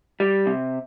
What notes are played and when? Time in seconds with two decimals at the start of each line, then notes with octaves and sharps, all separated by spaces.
0.20 G3
0.47 C3